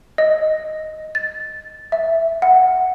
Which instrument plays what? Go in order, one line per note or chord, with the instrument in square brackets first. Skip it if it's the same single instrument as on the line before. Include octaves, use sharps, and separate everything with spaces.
[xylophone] D#5
A6
E5
F#5